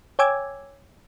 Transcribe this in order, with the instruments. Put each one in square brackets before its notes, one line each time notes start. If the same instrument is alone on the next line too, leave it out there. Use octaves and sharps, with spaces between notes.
[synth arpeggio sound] C#5 G5 G#5 D6 E6 G#6